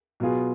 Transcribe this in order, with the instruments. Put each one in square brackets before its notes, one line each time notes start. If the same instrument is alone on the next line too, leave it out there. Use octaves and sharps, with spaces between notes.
[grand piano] B2 F#3 B3 F4 G#4